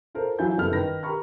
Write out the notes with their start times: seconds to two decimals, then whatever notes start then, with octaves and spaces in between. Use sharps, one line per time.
0.15 F4 A4 A#4 C5
0.39 E3 F#3 E4 F5 G#5 G6
0.57 F#1 G3 B3 E4 A4 F6
0.73 D#3 B4 A#6
1.03 G4 A#4 A#5 B5 C#6 F6